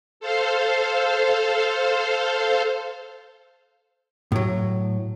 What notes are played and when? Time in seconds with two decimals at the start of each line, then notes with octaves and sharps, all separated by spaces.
0.20 A4 C5 F5
4.32 A2 F#3